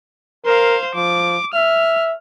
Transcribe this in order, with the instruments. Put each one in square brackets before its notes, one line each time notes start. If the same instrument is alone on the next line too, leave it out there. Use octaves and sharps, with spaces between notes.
[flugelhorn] A#4 [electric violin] C5 F5
[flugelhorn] F3 [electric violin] D6
[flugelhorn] E5 [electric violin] F6